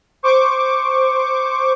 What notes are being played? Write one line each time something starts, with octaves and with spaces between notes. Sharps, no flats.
C5 C#6 D6